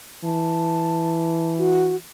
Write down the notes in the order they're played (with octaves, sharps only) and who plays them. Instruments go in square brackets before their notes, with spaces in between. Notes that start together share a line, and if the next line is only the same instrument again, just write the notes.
[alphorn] E3 [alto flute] A5
[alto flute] F#4